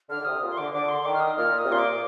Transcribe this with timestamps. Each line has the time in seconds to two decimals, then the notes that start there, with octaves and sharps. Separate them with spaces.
0.09 D3 F6
0.20 D3
0.25 C3 D#6
0.41 A#2
0.50 C6
0.57 D3 D6
0.73 D3 D6
0.89 C6
1.05 D#3 D6
1.14 F6
1.20 D#6
1.37 A#2 F6
1.58 D#6
1.65 C3
1.69 A#2 C6
1.79 D6